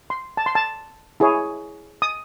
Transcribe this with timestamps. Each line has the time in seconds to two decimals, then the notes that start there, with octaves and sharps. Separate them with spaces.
0.10 C6
0.37 A5
0.46 C6
0.55 A5
1.20 E4 G#4 C#5
2.02 D#6